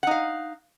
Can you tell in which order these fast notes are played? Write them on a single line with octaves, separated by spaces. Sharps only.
F#5 D#4 F5